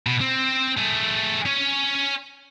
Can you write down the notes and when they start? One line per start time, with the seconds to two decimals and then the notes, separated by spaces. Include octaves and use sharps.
0.07 B2
0.20 C4
0.77 A3 G#4
1.46 C#4 C#5